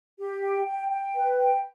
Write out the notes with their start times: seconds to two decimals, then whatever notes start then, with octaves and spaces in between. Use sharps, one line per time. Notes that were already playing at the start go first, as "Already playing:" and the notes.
0.19 G4
0.42 G5
0.66 G5
0.91 G5
1.15 B4
1.37 G5